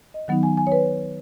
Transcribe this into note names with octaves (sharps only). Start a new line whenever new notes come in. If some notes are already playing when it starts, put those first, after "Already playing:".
D#5
D#3 F#3 B3 D#4 F#5
G#5
G#5
C#5
B4